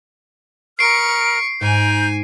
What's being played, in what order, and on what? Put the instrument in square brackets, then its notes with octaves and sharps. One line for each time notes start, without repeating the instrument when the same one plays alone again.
[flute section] A#4 D#6 F6 [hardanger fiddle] C#6 [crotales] C7 D7
[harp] G#2 [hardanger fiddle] G#5 [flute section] A#5 G6